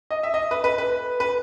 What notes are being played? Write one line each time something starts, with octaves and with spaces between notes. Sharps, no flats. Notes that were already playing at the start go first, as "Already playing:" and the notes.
D#5
E5
D#5
B4
B4
B4
B4